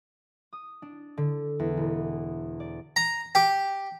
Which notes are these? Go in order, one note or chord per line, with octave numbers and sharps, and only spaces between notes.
D#6
D4
D3
E2
E1
D5
A#5
G4